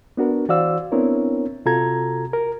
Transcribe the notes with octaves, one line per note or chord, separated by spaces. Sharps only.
B3 D4 F#4 A#4 B4
E3 F#4 C5 D5 F5 E6
B3 C4 D4 E4 A#4 C#5
C3 F4 F#4 A4 A#5 G#6
A#4